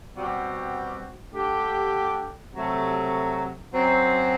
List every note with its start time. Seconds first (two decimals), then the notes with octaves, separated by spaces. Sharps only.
0.14 B2 G3 C4 F#4
1.34 D3 A3 D4 G4
2.54 C3 F#3 A3
3.74 F#2 F#3 C4